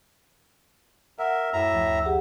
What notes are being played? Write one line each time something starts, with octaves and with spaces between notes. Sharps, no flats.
A#4 E5 F#5
F#2 A2 E5 A#5
D2 F3
G4 G#4 F#5